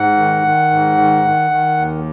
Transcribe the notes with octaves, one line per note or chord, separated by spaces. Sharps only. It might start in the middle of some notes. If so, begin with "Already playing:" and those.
Already playing: G#2 F#5
D#3
D#3
G#2
D#3
D#3
D#3
D#2